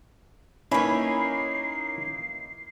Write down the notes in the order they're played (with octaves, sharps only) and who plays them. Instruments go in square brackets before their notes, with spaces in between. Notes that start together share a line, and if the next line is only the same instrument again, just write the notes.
[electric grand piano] A#3 D#4 E4 [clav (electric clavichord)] C#4 [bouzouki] B4 C#5 [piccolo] C7